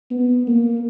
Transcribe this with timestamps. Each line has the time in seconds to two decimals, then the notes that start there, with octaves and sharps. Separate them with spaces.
0.11 B3
0.47 A#3